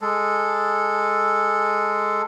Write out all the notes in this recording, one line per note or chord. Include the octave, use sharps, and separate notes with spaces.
G#3 A4